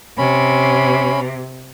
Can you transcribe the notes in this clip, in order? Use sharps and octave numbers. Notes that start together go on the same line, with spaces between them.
C3 C#4 B5